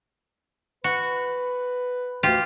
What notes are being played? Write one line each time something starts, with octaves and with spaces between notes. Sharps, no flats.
F#4 B4
D2 F4 G4